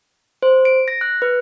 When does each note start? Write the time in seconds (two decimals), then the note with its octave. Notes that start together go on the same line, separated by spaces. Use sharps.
0.43 C5
0.65 D7
0.88 A#6
1.01 F#6
1.22 B4